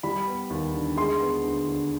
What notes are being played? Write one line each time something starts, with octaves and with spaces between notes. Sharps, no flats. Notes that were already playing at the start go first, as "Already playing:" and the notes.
G3 B5
B3
D#2
D3
G#3 C6
B3
D2
D3